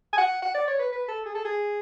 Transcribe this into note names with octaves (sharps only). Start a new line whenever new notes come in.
G#5
F#5
F#5
D5
C#5
B4
B4
A4
G#4
A4
G#4